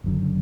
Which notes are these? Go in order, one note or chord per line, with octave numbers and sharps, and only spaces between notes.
F#1 F#2 D3